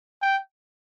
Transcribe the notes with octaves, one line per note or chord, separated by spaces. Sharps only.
G5